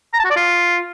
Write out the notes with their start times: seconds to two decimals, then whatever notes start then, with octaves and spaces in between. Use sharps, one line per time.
0.13 A#5
0.19 A5
0.25 F#4
0.30 D5
0.36 F4